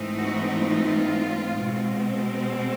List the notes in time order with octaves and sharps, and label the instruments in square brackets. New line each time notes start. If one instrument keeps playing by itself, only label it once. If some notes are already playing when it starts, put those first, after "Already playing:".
Already playing: [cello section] G#2 E3 A3 C4 D#4
F#4
F4
B2 G#3 C4